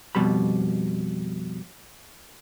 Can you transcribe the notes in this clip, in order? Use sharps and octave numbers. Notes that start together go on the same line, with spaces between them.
F2 B2 G3 B5